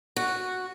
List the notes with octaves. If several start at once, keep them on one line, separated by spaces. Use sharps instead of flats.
F#4